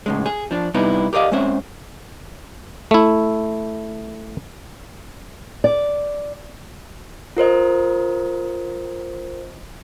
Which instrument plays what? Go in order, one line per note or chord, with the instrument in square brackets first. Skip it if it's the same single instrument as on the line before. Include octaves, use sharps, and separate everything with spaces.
[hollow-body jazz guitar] A2 C#3 G#3
G#4
F3 D4
C3 G3 B3 D#4 E4 B4
G4 A#4 D5 D#5 F5
G#3 C4 C#4 C5 E5
[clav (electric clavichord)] A3 E4
[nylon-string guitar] D5
[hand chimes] F4 A#4 C5 D#5